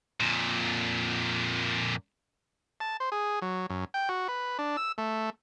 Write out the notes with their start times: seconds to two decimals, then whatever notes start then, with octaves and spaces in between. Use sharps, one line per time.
0.20 F2 A#2
2.80 A5
3.00 C5
3.12 G#4
3.42 F#3
3.70 F#2
3.94 G5
4.09 F#4
4.28 B4
4.59 D4
4.77 E6
4.98 A3